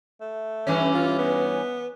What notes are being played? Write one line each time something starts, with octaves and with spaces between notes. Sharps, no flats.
A3
G2 E3 C#4
F4
B3